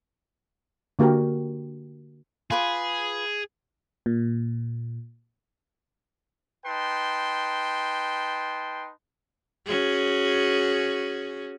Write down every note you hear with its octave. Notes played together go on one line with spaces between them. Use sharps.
D3 A#3 F#4 G4 A#4
F4 G#4 B4 D6
A#2
D#4 B4 G5 A5 C6
C#4 F#4 G#4